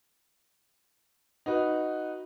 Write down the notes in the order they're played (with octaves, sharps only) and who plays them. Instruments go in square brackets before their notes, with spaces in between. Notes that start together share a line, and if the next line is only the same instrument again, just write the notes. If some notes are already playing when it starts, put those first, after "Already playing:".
[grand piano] D#4 F#4 B4